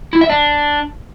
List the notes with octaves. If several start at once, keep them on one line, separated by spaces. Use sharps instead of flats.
E4
E5
D4